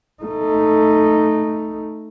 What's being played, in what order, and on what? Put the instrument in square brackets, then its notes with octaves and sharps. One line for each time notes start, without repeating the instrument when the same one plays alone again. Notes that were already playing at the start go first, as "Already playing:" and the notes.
[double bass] A3 D#4